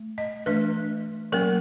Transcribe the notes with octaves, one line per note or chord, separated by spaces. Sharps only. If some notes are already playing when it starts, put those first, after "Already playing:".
Already playing: A3
D#5
E3 A3 D4 B4
F#3 A#3 C#4 A#4